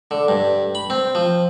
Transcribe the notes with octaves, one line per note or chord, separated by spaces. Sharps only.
D3
G2
B5
C4
F3